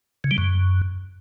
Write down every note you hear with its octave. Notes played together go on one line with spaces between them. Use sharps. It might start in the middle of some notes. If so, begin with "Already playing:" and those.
C#3
G3
F#2